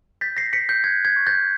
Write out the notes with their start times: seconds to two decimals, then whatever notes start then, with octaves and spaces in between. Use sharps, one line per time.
0.21 G6 A6 B6
0.37 A#6 C7
0.53 G6 B6 C#7
0.69 G6
0.84 F#6 G#6
1.05 G#6
1.16 C#6
1.27 G6 A6